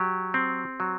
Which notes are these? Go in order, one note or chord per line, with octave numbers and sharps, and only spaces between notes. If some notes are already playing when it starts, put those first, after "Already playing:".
Already playing: F#3 G4
C4
F#3